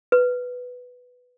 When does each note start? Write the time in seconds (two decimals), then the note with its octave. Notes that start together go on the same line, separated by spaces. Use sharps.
0.12 B4